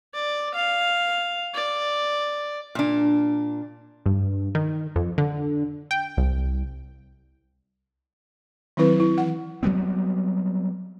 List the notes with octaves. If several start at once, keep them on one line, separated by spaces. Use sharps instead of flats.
D5
F5
D5
A#2 D4
G2
D#3
F2
D3
G5
C2
D#3 F#3 C4 E4 B4
E4
E3 F#5
F#3 G3 B3 C4